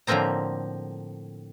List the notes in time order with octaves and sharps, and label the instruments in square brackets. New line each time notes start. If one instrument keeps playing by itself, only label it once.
[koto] A2 D3 F3 A#3 C4 A#5